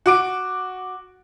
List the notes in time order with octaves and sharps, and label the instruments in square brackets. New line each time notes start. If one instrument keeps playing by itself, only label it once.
[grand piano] F#4 D6 D7